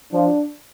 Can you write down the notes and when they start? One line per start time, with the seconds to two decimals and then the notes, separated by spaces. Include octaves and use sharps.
0.12 F3 D4